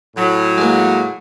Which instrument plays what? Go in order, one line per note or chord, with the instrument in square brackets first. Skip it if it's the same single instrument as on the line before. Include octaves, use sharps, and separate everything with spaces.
[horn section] A2 F#3
[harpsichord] G#3 A#3